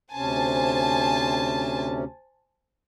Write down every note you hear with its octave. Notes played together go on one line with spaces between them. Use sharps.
D2 C3 C#4 C5 G#5 A5